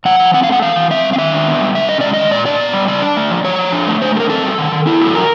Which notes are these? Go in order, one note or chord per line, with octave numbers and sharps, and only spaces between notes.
F3 F#5
F3
C4 F#5
F5
A3
F#5
E3 F5
E3
C4 E5
G3
F5
D#3 E5
D4
B3
G3
C3 E5
C#4 D#5
G#3 D5
D#3 D#5
A#2 D5
D4 D5
B3
G3
C#3 D5
D4
A3
F3
F3 C#5
F3
D4
A3
D3 C5
D3 A4 A#4
C4 A4
G3
D#3
D#3
B3 E4
F#3 A4
F3 A#4